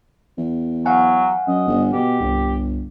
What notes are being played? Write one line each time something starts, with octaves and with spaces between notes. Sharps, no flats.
E2
F#3 F5 F#5 G#5
F#2 D#5
G1
B2 G4
G1 C2